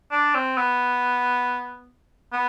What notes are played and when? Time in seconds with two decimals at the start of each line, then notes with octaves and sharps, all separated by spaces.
0.11 D4
0.34 C4
0.58 B3
2.33 B3